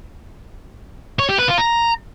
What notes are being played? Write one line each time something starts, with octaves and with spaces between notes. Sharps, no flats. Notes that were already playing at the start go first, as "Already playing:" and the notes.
C#5
G4
B4
F4
A#5